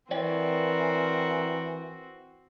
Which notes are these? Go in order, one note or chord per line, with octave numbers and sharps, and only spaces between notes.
E3 C4 F#4 A#4 C#5 D5 G5